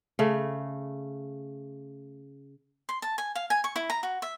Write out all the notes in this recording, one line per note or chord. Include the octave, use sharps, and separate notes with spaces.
C#3 A3
C6
A5
G#5
F5
G#5
C#6
E4
A#5
F#4
E5